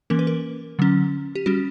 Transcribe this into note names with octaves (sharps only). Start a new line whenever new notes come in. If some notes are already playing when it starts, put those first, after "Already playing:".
E3 A#3 C#4 A#4
B4
A#4
D3 F#3 C#4
G4
G3 C#4 F#4